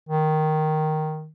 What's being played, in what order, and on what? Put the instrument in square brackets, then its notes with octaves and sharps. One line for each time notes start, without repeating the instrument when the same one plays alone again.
[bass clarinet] D#3